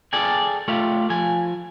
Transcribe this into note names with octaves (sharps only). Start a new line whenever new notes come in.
G#4 A4 D5 G5 G#5
A3 F4 G4
F3 G#5